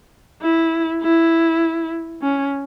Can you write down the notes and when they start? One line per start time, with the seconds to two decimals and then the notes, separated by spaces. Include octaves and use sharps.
0.42 E4
1.02 E4
2.22 C#4